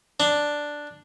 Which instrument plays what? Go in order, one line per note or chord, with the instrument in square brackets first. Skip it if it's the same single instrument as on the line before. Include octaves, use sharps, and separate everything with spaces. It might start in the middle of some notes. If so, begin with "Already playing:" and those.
[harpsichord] D4